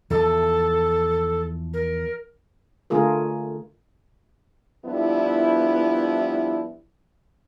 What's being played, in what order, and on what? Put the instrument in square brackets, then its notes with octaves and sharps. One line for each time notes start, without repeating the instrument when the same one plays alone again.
[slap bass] E2 F3 [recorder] A4
[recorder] A#4
[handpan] D3 A3 F4 G#4 A#4
[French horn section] F3 G3 B3 D4 E4